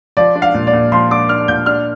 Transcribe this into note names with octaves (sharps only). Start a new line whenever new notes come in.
F3 D5
D4
F5
A#2
D5
A#2
F3 C6
D4 D6
D4 F6
A#2 G6
D4 F6